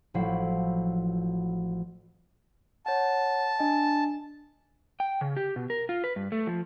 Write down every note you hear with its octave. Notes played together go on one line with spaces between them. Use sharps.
A1 F3 F#3 E4 C7
C#5 F#5 A5
D4 D#5 G#5
G5
C#3
G4
B2
A#4
F4
B4
G2
A3
F3